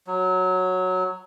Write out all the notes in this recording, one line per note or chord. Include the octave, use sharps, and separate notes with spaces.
F#3